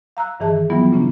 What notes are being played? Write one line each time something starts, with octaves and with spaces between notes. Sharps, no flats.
F5 A#5 E6 F#6
G2 D#3 E3 G#4 D#5 A5
E3 F#3 G3 B3 E4 F4
A#2 C#3 A#3 C#4 D4 E4